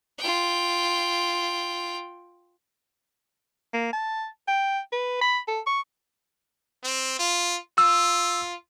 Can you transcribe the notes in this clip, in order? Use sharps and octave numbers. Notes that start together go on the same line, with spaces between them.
F4 G5
A#3
A5
G5
B4
B5
A4
C#6
C4
F4
F4 E6